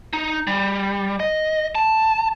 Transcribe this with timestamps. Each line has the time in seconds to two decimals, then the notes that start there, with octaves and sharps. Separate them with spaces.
0.13 D#4
0.47 G3
1.20 D#5
1.75 A5